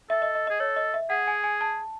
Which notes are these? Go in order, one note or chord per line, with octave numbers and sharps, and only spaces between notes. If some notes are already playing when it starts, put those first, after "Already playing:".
A4 E5
D#5
D#5
G#4 D#5
A4 C#5
D#5
E5
G#4 F#5
G#5
G#5
A5